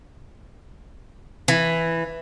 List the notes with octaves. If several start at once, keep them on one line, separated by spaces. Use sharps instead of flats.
E3